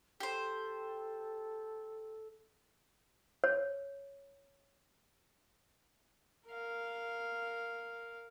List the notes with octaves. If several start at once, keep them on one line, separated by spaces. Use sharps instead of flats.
G4 A4 C5
C#5
A#4 F5